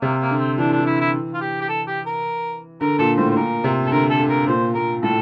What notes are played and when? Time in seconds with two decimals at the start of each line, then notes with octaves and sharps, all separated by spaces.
0.02 C3 A#3
0.21 A#3
0.30 D3
0.39 C4
0.58 E3 D4
0.68 D3 D4
0.79 E3
0.86 E4
1.00 E4
1.34 F4
1.41 G4
1.61 G4
1.69 A4
1.87 G4
2.06 A#4
2.81 D3 A#4
2.98 A#2 A4
3.17 A2 C5
3.30 C5
3.36 A#2 A#4
3.64 C3
3.86 A4
3.91 D3 A#4
4.10 A4
4.20 D3
4.29 A#4
4.47 A#2 C5
4.75 A#2 A#4
5.03 A2 A4